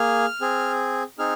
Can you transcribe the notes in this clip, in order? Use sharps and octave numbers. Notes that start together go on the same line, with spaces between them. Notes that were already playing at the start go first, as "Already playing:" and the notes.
Already playing: A#3 G#4 F6
C4 G#4
C4 D#4 G#4 F6